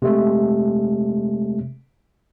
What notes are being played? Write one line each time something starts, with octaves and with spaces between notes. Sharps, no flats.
C3 G#3 A3